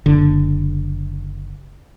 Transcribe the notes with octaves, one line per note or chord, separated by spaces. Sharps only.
F#1 D3